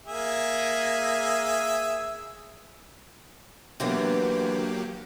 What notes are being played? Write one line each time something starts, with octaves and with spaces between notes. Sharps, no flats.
A#3 G#4 E5
D3 E3 F#3 A#3 B3 G4